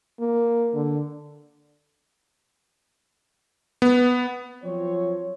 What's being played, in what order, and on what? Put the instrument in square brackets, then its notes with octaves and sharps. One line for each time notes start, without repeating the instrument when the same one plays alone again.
[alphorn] A#3
D3
[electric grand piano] B3
[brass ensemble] F3 F#3 C4 C#5